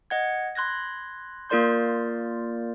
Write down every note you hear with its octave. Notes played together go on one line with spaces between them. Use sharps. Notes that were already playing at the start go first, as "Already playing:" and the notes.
D#5 F#5 G#6
B5 C6 F#6 G#6 A#6
A#3 F4 A#4 D5 C6 G6